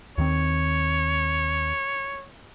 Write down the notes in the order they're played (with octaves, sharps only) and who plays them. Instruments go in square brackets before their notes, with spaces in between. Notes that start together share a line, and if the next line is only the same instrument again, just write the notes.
[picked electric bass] D#2 D#3 C4 [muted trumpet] C#5